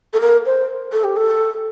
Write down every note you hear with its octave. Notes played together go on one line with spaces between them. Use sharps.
A4
A#4
C5
A4
G4
A4